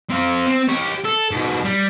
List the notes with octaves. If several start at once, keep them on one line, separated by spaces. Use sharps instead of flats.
C4 F5
C4
G4 C#5
A4
G#2 B2
G3